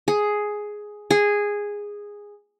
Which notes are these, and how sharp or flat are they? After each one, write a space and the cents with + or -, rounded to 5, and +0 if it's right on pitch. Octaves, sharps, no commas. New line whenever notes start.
G#4 +5
G#4 -10